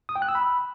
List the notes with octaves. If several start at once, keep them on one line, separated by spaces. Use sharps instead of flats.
D#6
G5
F#6
E6
B5